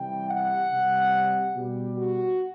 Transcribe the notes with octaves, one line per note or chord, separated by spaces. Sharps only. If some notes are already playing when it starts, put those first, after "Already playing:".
Already playing: C3 E3 G3 G5
F#5
C3 G3
B2 G3 G4
F#4